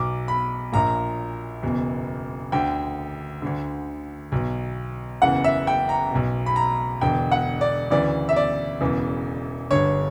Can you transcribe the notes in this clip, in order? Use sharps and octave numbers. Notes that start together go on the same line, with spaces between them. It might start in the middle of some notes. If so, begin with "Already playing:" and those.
Already playing: B1 B2 D6
B5
A#1 A#2 A#5
F#1 E2 B2
D2 D3 G5
D2 D3
B1 B2
F#1 E2 C#3 E3 F#5
E5
G5
A#5
B1 B2
B5
A#5
E1 E2 D3 G5
F#5
D5
D2 C#3 E3 D5
E5
D5
E1 E2 C#3 E3
G1 G2 D3 C#5